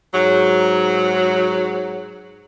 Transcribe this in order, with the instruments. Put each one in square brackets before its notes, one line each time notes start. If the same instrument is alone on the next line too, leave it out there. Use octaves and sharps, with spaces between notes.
[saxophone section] G#2 F#3